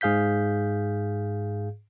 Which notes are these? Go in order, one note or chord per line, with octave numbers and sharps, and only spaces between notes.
G#2 G#4 F5 G6 B6